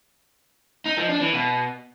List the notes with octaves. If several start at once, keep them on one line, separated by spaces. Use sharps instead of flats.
D#4
F3
D4
E3
B2